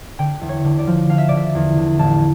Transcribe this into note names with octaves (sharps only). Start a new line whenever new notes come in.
D3 G5
E2
C#5
D3
D5
F3
D3 F5
E5
D3 D5
E5
E2
D3
A1 A5